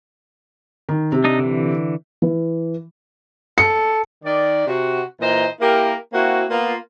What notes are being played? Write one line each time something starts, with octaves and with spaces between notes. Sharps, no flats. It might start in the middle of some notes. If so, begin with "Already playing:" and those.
D#3
C3
D4 D#4 D#5
D3 E3
E3
A4 C#7
D#3 D5
C3 F#4
A#2 E3 C5 D#5 A#5
A#3 E4 G4 A#4
A#3 C4 E4 F#4
A#3 B3 F4